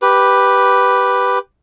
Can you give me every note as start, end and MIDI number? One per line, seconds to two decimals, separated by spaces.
0.02 1.39 67
0.02 1.39 71